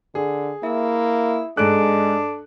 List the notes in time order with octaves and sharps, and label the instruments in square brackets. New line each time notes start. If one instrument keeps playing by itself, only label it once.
[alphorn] D3 [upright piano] G#4
[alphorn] A#3 [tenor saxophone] E4 [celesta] E5
[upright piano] G#2 F#6 [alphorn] G#3 [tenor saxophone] D4 [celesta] A4 D7